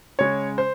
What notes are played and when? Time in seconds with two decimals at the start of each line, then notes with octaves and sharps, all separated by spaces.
0.19 C#3 G#3 C#5
0.58 C5